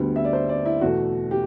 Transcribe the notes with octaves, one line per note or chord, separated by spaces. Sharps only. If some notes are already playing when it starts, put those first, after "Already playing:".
Already playing: D2 D3 G3 B3
E5
D5
C5
D5
E4
E2 B2 A3 F#4
G4